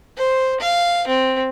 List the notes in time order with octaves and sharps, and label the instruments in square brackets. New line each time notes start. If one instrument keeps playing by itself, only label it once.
[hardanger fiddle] C5
F5
C4